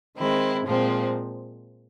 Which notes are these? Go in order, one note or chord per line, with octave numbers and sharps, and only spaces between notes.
D#3 G#3 C4 E4
A#2 F3 G#3 C4